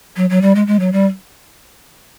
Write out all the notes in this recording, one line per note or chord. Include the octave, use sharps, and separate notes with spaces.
F#3
F#3
G3
G#3
G#3
F#3
G3